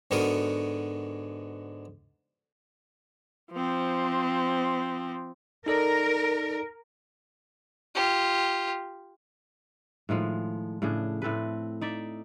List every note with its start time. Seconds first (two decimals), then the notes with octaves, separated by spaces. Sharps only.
0.11 G#2 D3 B3 F#4 A#4 D#6
3.52 F3 C4
5.66 D#4 A4 A#4 D5
7.95 F4 G4
10.09 A2 D#3 F3 G#3
10.82 A2 C#3 D4 G#4
11.22 A2 C4 A4 B4
11.81 D#4 D5 E5